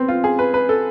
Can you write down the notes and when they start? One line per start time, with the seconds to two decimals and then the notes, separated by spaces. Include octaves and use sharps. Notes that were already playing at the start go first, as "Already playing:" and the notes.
Already playing: B3 C4
0.08 F4
0.24 G#4
0.39 B4
0.54 B4
0.69 A4